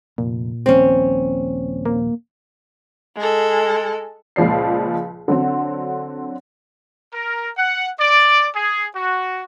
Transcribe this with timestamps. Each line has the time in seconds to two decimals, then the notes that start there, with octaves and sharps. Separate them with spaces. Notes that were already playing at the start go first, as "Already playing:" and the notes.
0.18 F1 A#2
0.66 D#1 A#1 C4 C#4
1.86 A#3
3.17 G#3 A4
4.36 C#2 A#2 F3 D5 C7
5.28 D3 F#3 C4
7.14 A#4
7.58 F#5
7.99 D5
8.55 G#4
8.95 F#4